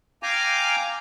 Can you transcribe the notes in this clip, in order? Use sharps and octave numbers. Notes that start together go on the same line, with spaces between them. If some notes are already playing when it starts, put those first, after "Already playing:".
F5 G5 G#5 A#5 D6